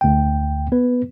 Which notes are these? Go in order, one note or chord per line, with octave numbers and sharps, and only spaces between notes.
D2 G5
B3 B4